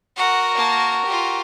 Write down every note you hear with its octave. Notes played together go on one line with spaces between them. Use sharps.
F#4 A#4 F#5
A#3 A5
F4 G4